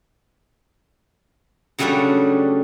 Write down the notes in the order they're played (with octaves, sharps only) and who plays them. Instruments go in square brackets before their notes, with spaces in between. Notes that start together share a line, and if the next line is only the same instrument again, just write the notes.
[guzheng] C#3 F#3 G3 A3 C#4 D4